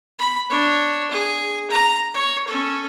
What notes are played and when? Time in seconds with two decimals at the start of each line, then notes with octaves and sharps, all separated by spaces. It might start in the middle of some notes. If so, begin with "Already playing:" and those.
0.19 B5
0.50 D4 C#5
1.11 G#4
1.70 A#5
2.14 C#5
2.47 C#4 A4